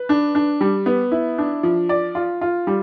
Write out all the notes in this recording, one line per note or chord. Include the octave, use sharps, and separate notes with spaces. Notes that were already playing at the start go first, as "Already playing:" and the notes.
Already playing: B4
D4
D4
G3
B3
E4
D4
F3
D5
F4
F4
G3